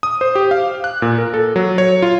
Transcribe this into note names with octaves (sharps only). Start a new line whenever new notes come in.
D#6
C5
G4
F5
F#6
A#2
A#4
A4
F#3
C#5
F4